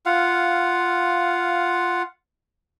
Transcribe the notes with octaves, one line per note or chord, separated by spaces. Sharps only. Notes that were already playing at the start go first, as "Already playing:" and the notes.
F4 F5 F#5